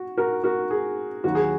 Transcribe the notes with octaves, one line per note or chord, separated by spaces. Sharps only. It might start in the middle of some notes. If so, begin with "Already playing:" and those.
Already playing: F#4
F#4 A#4
F#4 A#4
G#4
D#2 D#3 F#3 F#4
G#4